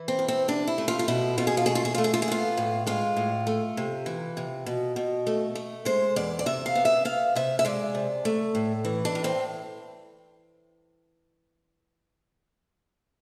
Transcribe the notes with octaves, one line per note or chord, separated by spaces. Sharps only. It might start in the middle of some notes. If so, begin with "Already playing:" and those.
Already playing: E3
C4
E2
C4
C3 D4
E4
A3
F4
F4
B2 E4
B2 F4
G#4
F4
A3 G#4
F4
G#4
A3 F4
G#4
F4
G#4
B3 F4
A2
G#3 F4
A2
A3
C3
E3
C3
B2
B2
A3
A3
G#3 C5
E2 D5
D5
C3 E5
F5
B3
E5
B3 F5
C3 E5
E5
G#3 D5
C3
A3
A2
E3
D4
A2
C4